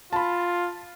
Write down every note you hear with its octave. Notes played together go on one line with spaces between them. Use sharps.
F4 A5 B5